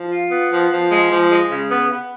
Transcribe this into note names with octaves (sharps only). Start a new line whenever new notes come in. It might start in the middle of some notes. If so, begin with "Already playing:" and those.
Already playing: F3
F4
B3
F3
F3
G#3
F3
G#3
C#3
B3
B3